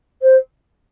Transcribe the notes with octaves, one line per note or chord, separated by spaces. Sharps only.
C5